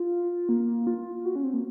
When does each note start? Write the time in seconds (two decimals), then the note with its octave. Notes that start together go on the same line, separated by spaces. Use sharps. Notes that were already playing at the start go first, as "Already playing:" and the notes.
Already playing: F4
0.49 A#3
0.87 F4
1.25 F#4
1.36 C#4
1.44 C4
1.54 A#3